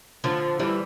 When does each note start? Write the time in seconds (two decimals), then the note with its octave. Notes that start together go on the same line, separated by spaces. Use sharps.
0.24 D3 F3
0.59 E3 G3